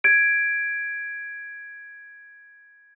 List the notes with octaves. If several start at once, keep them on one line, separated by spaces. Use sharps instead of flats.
G#6 D7